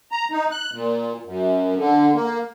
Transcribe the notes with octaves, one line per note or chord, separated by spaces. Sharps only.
A#5
D#4
F#6
A#2
F#2
D3
A#3